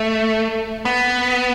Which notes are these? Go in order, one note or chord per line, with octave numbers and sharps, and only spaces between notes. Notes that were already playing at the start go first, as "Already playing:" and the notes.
Already playing: A3
B3